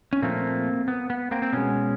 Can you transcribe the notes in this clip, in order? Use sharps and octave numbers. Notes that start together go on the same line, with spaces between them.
C#4
A#2 F3 A3 A#3 C4
B3
B3
A#3 C4
C4
B2 G#3 B3 C#4